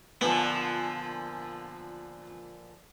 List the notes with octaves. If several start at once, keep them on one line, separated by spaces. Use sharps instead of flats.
A#2 D3 F3 B3